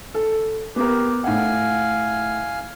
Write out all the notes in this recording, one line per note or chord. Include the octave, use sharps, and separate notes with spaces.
A4
B3 G4 A#4
A2 F5 F#5 G#5